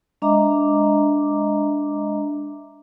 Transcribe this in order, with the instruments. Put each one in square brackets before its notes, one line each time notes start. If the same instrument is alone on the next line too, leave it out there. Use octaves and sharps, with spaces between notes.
[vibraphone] G#3 D4 D#5 E5 A#5 D6